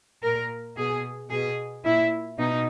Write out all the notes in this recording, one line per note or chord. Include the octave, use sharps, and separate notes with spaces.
A#2 A#4
B2 G#4
B2 G#4
A#2 E4
B2 D#4